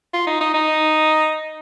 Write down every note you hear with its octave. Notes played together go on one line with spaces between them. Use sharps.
F4
D#4
D#4
D#4